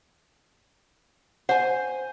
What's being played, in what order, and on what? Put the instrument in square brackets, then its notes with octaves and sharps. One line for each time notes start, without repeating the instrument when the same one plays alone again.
[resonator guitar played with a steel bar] C5 G#5 [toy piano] F#5